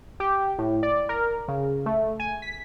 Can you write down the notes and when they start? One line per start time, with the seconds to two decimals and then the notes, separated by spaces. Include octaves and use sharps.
0.20 G4
0.59 A2
0.83 D5
1.09 A#4
1.48 C#3
1.86 A3
2.20 G#5
2.42 B6